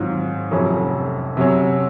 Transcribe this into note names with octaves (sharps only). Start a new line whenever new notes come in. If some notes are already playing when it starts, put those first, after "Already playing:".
Already playing: G#2 D#3 F#3 C4 F4
F1 F2 C3 F#3 C#4
C3 F#3 C#4